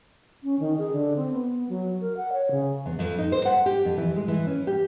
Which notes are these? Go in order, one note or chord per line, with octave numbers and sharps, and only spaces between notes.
C#4
D#3
G#4
D3
C4
B3
F#3
A#4
F#5
C#5
C#3
E2
F2
D#4
C5
F#5
G4
F2
E3
G#3
E3
C#4
G4